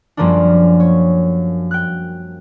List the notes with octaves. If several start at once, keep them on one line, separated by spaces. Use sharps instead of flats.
F#2 F3 G3 A#3 C#4 D4
C#5
G5 F#6